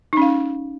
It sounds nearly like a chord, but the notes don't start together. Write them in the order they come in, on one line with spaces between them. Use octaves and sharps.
D#4 C#4 F5